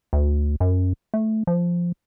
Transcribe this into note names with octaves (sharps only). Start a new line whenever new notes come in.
D2
F#2
A3
F3